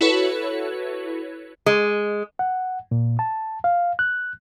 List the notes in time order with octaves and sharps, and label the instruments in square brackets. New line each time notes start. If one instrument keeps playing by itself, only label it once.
[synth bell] E4 F#4 A4 B4 C#5
[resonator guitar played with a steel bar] G#3
[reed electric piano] F#5
A#2
A5
F5
F#6